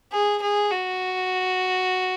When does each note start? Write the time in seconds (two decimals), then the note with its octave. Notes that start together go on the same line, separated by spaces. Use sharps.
0.12 G#4
0.42 G#4
0.71 F#4